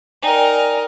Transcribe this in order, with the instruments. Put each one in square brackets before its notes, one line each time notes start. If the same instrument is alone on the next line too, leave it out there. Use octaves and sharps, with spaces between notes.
[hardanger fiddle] D#4 A#4 [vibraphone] D5 G5 G#5